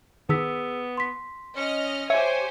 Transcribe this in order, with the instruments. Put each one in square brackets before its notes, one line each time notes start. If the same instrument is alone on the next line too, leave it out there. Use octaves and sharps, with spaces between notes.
[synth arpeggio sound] D#3 [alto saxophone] B3 [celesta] G#4 E6 B6
[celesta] C6 B6
[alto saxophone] C#4 [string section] D#5 F6
[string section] G4 C5 G#5 [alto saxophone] C#5 [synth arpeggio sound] E5